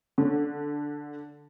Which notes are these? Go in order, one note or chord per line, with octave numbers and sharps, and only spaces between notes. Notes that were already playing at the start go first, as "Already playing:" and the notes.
D3